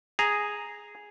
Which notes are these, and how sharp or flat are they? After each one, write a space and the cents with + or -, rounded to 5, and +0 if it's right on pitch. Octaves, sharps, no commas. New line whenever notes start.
G#4 +0 A#5 +0